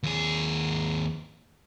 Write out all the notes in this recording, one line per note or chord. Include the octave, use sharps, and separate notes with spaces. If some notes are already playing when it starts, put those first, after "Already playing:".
D#2 G#4